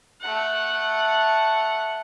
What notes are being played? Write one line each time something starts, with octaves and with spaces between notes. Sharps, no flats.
A3 F#5